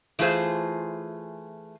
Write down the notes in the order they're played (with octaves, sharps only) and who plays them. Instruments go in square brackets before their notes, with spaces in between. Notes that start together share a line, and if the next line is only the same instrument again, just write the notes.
[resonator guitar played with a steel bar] E3 A3 F4 G#4 C5